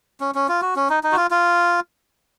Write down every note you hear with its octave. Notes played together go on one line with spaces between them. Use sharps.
C#4
C#4
F4
F#4
C#4
D#4
D#4
F#4
F4
F4